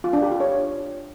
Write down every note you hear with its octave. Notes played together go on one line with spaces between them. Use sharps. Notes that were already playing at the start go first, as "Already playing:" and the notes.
F4
D4
G4
F4
C#5